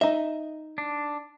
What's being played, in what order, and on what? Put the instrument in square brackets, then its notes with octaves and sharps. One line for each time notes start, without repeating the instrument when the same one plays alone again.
[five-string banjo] D#4 D#5 [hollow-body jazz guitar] E5
[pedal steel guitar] D4